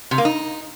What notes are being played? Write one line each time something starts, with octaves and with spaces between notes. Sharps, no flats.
C3
A#3
D#4